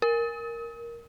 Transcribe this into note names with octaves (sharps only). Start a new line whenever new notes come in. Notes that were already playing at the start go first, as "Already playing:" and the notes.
A#4